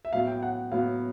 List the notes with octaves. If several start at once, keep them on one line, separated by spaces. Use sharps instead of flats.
E5
A2 F#3 B3 F5
G5
F#5
A2 F#3 B3 F5